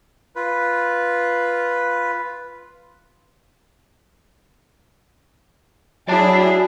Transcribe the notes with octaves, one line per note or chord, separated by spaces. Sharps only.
F4 B4
F#3 E4 G#4 D5 A5